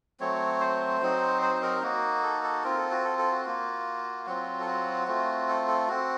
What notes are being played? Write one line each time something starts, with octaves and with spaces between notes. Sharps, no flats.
F#3 A3 C4 C#5
C5
F#3 C4 D#4
C5
C5
A#4
A#3 D#4 F#4
A4
A4
C4 F4 A#4
A4
F#4
A4
A4
F#4
A#3 F4
F#3 C4 F4 F#4
A4
F#4
A3 C4 F4
A4
A4
C4 F#4